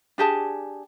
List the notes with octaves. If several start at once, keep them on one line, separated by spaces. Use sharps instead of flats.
D4 G4 G#4 A5